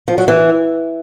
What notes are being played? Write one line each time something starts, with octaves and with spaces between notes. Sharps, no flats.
F3
F#3
E3